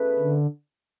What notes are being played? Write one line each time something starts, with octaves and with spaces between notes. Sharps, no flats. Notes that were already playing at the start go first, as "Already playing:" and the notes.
Already playing: B2 A3 C#4 G#4 B4
D3